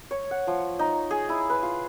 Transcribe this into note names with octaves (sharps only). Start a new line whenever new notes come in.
C#5
F#5
F3
D#4
G#4
E4
B4
F4